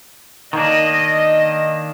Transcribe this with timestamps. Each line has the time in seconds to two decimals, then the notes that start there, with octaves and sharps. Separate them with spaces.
0.53 D#3 A#3 D4 D#5